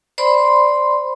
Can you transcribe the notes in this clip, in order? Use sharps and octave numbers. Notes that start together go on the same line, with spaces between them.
C5 D5 B5 C6